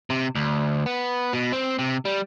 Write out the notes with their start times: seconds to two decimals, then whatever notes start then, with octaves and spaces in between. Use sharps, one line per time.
0.10 C3
0.35 D2
0.86 B3
1.33 B2
1.52 C4
1.79 C3
2.05 G3